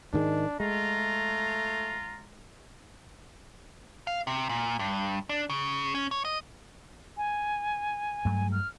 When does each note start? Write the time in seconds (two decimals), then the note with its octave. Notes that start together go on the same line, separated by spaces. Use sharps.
0.14 G#2 D#3 G#3 D4
0.60 G#3 A3 F4 A#5
4.07 F5
4.27 C3
4.49 A#2
4.79 G2
5.29 D4
5.50 C#3
5.95 C#4
6.11 C#5
6.25 D#5
7.17 G#5
8.25 G2 F#3 A3
8.52 F6